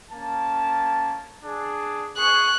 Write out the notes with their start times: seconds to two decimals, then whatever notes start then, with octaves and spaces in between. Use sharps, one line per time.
0.11 A#3 C#4 A5
1.43 D4 G#4
2.18 G#4 C#6 F#6